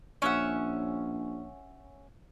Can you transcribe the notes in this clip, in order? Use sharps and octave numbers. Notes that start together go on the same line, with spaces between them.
A#1 C#4 E5 F#5